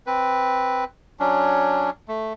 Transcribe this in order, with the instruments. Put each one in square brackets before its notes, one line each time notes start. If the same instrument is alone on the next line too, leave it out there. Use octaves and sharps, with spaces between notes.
[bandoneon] C4 B4
F#3 C#4 D4
A3